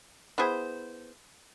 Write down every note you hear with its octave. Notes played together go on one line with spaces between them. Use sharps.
B3 E4 G#4 C5